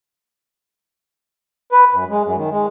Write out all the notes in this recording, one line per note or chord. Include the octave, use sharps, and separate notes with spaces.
B4
F#2
G#3
F#2
D#3
G#3